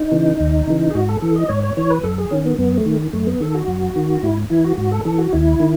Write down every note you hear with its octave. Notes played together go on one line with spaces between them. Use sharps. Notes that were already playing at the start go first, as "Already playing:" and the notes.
Already playing: D#4
C#3 E3
D#2
C#3 E3
G#4
G#2 F#4
A4
E3 A4
D#5
G#2 C#5
C#5
E3 C#5
B4
F#2 A4
G#4
D#3 C#4
B3
F#2 B3
A3
D#3
F#2 A3
B3
D#3 A4
F#4
F#2
D#3
G#2 E4
E3 E4
F#4
G#2 F#4
A4
E3 A4
F#4
D#2 E4
D#3